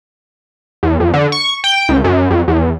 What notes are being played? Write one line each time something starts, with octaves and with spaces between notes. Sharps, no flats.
E2
F2
D3
C#6
G5
C#2
F#2
F2
E2